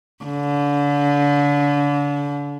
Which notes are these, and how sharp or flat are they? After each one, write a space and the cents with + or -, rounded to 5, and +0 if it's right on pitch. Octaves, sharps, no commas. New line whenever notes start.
D3 -35